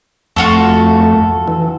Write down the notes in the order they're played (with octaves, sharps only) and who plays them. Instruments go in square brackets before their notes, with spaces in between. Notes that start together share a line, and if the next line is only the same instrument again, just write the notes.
[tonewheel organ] F2 A3 [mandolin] F4 F#4 A4
[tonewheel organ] E3